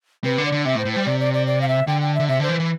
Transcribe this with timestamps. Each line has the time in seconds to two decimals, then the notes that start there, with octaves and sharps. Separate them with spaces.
0.24 C3 B4
0.38 D3
0.46 D5
0.52 D3
0.65 C3 E5
0.75 A2
0.79 C5
0.85 A2
0.93 G3 C5
1.06 C3 D5
1.20 D5
1.34 D5
1.47 D5
1.62 F5
1.68 E5
1.87 D3 G5
2.01 G5
2.15 D3 E5
2.28 C3 E5
2.40 D3 C5
2.49 E3
2.60 E3